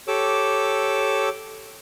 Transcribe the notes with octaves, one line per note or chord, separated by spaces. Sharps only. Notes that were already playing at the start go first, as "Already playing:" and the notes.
G4 A4 C#5 D6 E6